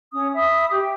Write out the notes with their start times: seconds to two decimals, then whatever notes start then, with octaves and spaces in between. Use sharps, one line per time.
0.12 C#4 D#6
0.35 E5 B5 D#6
0.72 G4 G5